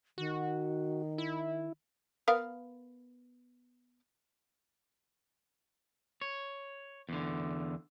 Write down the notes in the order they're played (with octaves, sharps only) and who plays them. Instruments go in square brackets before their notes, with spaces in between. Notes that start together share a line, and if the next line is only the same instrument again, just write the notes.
[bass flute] D#3 [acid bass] F#4
[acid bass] E4
[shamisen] B3 A#4 F5
[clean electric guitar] C#5
E2 D3